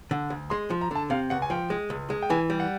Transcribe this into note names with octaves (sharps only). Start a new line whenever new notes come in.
D3
D2
G#3 C6
F3
A#5
D3 A5
C3 F5
C#2 F#5
G#5
F3 G5
G#3
C#2
G#3
G5
E3 G#5
G3
F#5